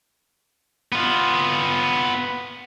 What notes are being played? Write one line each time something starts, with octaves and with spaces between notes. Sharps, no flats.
B3 F4